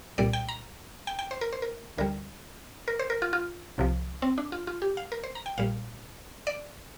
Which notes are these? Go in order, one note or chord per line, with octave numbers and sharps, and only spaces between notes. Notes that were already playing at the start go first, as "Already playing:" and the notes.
C2 A#2 G3 D5
G5
A#5
G5
G5
C5
A#4
C5
A#4
D2 D3 G3 A#4
A#4
C5
A#4
F4
F4
C2 C3 F3
C4
D4
F4
F4
G4
F5
A#4
C5
A#5
G5
A#1 A#2 G3 F5
D5